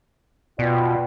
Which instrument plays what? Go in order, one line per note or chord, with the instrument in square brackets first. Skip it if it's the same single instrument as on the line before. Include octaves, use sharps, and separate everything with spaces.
[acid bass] B2 [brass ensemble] F4 D5 G5